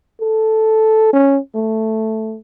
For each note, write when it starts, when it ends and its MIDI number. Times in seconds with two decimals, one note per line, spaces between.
0.21 1.09 69
1.13 1.39 61
1.55 2.37 57